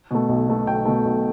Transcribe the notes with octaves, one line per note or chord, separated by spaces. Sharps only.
B2 A3
B1
B2 A3
B1 G5
B2 A3
B1